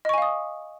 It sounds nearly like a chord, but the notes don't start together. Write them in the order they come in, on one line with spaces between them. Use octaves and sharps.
D#5 C#6 G#5 F5 D#6